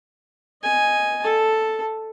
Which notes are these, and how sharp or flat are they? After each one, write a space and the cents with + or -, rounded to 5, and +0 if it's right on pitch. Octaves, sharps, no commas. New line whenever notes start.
D#5 +0 G#5 +0
A4 +0 A5 +0